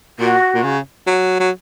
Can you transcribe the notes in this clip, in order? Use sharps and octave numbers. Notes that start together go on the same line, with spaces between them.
A#2 F#4
A#2
C#3
F#3
F#3